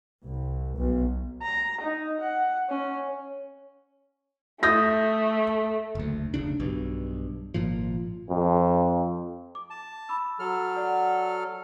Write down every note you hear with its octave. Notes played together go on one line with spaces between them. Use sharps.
C2
B1
A#5
D#4
F#5
C#4
A3 D#6 G6 A#6
F#1 D2
F1 B1 C#3 D4
B1 G2
G#1 A#2 F3
F2
D6
A5
B5 D6 E6
F#3 A4 F6
D5 F#5